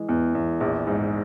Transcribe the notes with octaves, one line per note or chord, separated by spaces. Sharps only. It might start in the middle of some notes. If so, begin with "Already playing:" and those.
Already playing: E3 G#3
E2
E2
A#1
G#2